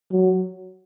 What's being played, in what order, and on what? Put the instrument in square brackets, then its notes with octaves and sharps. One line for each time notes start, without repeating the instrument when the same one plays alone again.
[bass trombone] F#3